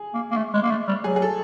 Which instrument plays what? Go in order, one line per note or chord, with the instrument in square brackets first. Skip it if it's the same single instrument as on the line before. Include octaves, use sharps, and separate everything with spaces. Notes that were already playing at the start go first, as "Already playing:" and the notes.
Already playing: [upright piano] G#4
[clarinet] A#3
A#3
A3
G#3
A#3
A3
G3
[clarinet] F#3 [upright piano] G#4
[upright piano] G#4
A4